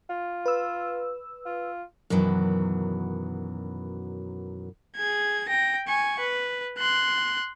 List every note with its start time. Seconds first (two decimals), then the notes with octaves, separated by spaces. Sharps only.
0.10 F4
0.46 B4 E6
1.46 F4
2.10 F#2 B2 D#3 E3 F#3
4.96 G#4 G#6
5.49 G5 A#6
5.87 G#5 C#6
6.20 B4
6.78 C6 F#6